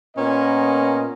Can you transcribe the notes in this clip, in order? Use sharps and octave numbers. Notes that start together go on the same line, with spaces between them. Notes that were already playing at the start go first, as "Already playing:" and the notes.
A#2 B3 C#4 A#4 D#5